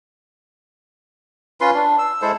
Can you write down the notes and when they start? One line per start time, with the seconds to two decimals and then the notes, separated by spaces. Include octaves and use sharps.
1.61 C#4 F4 B4 C6
1.74 D4
1.99 E6
2.22 G#3 E4 A4 C5